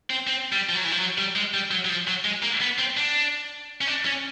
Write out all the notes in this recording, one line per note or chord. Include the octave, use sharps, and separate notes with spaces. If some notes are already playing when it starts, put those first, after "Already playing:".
C4
C4
G3
F3
F#3
E3
F3
F#3
G3
G#3
G3
F#3
F#3
F3
F#3
G#3
A#3
B3
C4
D4
C#4
D4
C#4